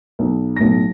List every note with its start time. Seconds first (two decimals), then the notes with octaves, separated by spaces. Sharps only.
0.19 B1
0.56 B1 A2 A#6